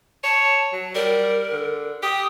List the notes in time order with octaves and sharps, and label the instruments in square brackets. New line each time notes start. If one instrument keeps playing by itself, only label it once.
[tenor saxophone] C#5 [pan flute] A5
[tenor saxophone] F#3
[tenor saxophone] G3 [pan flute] A#4
[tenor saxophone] D3
[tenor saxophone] G4 [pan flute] D#6